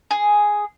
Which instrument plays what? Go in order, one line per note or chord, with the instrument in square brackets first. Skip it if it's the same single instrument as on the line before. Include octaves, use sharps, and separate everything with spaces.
[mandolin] G#4